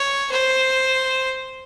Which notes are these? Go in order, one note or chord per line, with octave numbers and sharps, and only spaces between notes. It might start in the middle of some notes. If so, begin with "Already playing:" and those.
Already playing: C#5
C5